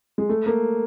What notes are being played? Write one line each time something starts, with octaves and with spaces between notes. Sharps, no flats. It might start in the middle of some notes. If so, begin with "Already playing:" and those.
G#3
A3
A#3